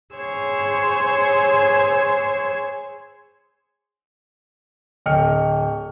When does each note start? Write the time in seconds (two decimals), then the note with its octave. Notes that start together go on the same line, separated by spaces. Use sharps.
0.14 G#4 C5 C#5 E6 G#6
5.06 D1 D#5 G5 F6 C#7